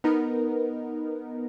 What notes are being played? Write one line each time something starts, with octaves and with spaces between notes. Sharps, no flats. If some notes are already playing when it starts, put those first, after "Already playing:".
B3 D#4 A#4